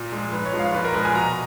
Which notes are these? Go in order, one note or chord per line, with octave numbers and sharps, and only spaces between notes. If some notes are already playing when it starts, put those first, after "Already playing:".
Already playing: A#2
F3 G#3
G#2 B4
C#5
F3 G#3
F5
A#2 B4
A#4
F3 G#3 B4
G#5
B2 A#5